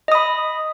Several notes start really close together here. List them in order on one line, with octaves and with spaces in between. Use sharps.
D#5 D#6 B5